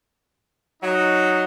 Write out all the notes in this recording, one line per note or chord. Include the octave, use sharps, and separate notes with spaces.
F#3 D#4